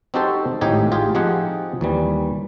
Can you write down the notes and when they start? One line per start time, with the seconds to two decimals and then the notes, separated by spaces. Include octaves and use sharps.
0.14 C4 D#4 F#4 G4 A4 C5
0.61 G#1 A2 D#4 G4 G#5
0.92 F4 G4 G#4
1.15 F3 C4 D#4 G4 G#4 F#5
1.81 D#2 E3 G3